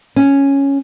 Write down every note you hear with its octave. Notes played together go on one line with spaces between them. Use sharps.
C#4